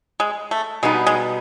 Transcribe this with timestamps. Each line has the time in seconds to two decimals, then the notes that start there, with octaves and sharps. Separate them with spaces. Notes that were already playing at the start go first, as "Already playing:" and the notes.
0.20 G#3
0.51 A3
0.83 B2 G3 G#3 B3 D#4
1.06 G#3